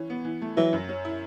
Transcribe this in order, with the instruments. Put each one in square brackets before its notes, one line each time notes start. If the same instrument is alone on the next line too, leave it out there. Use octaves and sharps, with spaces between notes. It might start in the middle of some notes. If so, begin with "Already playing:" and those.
Already playing: [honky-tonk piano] E3 C#4
B3
E3
A3
[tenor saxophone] E3 [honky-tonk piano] F#3
[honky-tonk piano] F#2
C#4
E4